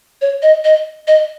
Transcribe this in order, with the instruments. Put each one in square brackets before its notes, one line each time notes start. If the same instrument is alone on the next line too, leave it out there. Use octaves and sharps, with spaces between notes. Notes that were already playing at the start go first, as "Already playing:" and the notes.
[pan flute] C#5
D#5
D#5
D#5